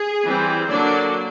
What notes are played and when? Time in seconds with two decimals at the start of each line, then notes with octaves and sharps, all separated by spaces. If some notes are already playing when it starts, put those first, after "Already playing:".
Already playing: G#4
0.24 E3 G3 C4
0.67 D3 F#3 A#3 D4 D5